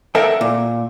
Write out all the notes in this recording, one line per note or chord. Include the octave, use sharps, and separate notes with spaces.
A4 A#4 E5 F#5 G5
A#2